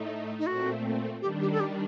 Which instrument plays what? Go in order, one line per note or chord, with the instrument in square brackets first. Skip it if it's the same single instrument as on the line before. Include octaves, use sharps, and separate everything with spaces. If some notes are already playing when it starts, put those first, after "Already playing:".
Already playing: [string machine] A2 A3 D#4
[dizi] D#4
[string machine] A#2 A3 C4 [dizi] F#4
[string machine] D#3 G3 D4 [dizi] G4
[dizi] G4
A4
G4